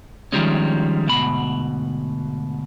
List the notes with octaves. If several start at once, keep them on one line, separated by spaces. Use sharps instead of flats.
D#3 F3 G3 G#3 C#4
D2 G#2 B2 B5